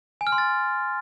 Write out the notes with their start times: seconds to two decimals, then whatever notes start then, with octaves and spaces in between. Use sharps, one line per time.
0.21 G#5
0.27 F6
0.32 C6
0.38 A6